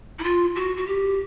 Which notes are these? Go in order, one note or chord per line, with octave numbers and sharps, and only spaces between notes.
E4
F4
F#4
F#4
G4